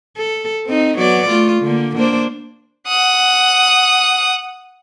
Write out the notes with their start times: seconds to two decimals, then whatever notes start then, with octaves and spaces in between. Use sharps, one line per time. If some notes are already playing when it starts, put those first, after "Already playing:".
0.17 A4
0.66 C4 D#4
0.98 F#3 B3 D5
1.29 A3 F4
1.63 D3 A#3
1.96 A#3 D4 C5
2.87 F#5 D#6